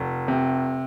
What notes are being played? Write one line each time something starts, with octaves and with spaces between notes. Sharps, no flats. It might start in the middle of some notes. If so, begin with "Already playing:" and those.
Already playing: F1
C3